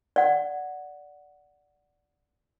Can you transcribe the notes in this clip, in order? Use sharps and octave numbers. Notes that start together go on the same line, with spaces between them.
D5 F#5